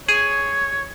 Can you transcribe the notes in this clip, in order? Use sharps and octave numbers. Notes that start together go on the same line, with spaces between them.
G#4 C#5